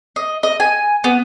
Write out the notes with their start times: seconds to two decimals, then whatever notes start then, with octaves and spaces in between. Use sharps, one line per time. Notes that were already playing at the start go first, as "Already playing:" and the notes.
0.16 D#5
0.43 D#5
0.60 G#5
1.04 B3